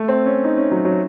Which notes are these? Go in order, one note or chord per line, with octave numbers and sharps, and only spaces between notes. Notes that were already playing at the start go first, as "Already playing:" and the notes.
Already playing: A3
C4
C#4
D#4
C#4
F#3
F#3